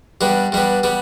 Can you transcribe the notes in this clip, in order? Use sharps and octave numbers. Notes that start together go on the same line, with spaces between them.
G2 G3 B3
G2 G3 B3
G3 B3